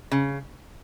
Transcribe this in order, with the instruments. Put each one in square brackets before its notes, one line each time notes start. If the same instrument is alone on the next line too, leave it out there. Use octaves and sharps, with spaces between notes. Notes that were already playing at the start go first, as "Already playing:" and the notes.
[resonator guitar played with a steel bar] C#3